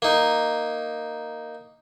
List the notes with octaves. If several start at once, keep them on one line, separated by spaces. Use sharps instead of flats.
A#3 D#4